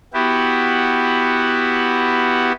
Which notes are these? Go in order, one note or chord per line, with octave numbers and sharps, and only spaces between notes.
B3 E4 F#4 G4